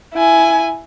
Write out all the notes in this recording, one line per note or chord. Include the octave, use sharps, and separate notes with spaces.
E4 G#5